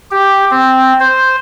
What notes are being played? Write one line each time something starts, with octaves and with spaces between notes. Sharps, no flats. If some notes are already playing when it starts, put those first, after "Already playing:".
G4
C4
C5